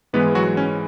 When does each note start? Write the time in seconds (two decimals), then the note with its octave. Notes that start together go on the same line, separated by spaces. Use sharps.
0.13 G#2 E3 G#3 B3 B4
0.35 F#3 F#4
0.57 C#4